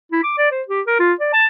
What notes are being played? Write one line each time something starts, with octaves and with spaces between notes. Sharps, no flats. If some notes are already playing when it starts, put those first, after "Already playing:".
E4
D6
D5
C5
G4
A#4
F4
D5
A5